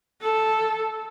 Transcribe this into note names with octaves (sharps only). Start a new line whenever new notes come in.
A4